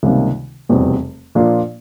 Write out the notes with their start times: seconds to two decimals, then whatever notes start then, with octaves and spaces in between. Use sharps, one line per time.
0.03 C#2 C3 D#3 G3 A#3
0.69 F1 E2 B2 G3 C4
1.35 A#2 F3 A#3 D4 F4